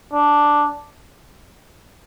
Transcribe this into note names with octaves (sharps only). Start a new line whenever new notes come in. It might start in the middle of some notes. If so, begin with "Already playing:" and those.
D4